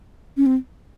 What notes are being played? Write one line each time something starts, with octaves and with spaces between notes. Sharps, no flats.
C#4
C4